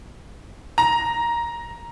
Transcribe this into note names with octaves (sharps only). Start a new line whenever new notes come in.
A#5